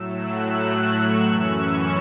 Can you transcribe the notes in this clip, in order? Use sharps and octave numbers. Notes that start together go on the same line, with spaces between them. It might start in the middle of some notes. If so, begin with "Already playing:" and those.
Already playing: A2 F#3 A3 E6
F#6
E6
C#6
F#2 E3 C#4 E6
C#6